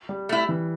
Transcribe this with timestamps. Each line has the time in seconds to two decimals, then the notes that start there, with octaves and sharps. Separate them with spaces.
0.09 G3
0.29 A3 E4
0.49 E3